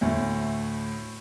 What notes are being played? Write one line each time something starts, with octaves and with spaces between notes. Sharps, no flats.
D2 A2